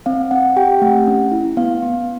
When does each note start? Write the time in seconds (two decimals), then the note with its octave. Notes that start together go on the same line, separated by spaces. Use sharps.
0.06 C4 F5
0.31 C4 F#5
0.56 G4 G5
0.82 A3 F#5
1.07 C#4
1.32 E4
1.57 B3 F5
1.83 B3